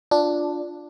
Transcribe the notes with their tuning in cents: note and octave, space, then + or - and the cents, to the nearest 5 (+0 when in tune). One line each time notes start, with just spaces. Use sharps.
D4 +0 F4 +0